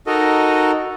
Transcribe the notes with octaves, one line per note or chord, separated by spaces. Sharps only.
D#4 F#4 A4 A#4 D#5